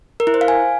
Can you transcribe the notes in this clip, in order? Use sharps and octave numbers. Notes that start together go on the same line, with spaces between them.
A#4
E4
C5
F5
G#5